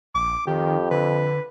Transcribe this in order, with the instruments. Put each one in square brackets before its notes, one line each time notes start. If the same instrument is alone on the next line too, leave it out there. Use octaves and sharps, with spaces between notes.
[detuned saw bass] A#1 [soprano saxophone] D6
[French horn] F2 [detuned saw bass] D#3 [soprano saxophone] G4
[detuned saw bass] D3 [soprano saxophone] B4